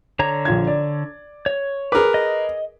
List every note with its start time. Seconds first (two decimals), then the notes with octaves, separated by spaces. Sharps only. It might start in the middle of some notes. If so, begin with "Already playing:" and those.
0.19 D3 C#5 A#5
0.45 A#1 F4 G#6
0.67 D5
1.46 C#5
1.92 G#4 A#4 B4 D6
2.14 D#5